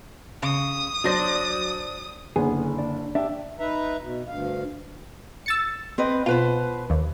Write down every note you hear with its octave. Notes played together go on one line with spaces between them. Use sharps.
C#3 D#6
F#3 D4 C5 D5 A#6
F#1 D3 B3 G#4
D4
D4 G4 E5
D#4 B4 E5 A#5
B2
D2 G2 F5
E6 A6 C#7
C4 B4 D#5
B2 F4 B4 C5
D#2